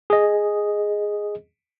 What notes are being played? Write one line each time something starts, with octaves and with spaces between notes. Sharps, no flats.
G#4 D#5